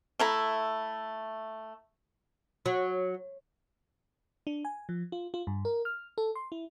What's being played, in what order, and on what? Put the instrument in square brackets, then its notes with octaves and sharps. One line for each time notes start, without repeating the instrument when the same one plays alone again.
[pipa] A3 E4 A#5
[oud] F#3
[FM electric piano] D4
G#5
F3
F4
F4
G2
A#4
F6
A4
C6
E4